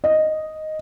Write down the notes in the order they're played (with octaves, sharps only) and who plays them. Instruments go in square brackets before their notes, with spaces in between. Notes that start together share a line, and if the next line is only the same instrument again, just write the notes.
[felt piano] D#5